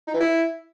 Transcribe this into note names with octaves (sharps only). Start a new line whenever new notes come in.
D#4
E3
E4